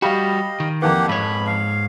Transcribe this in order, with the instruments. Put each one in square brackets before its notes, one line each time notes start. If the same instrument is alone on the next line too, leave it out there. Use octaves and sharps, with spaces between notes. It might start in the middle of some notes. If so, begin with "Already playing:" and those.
[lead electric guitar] G3 F#4 [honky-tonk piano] G4 F5 B5 [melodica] D#5
[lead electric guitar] D#3
[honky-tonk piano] F2 E3 [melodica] A#3 G4 F#5
[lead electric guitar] G#2 C#5 [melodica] B5
[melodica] F5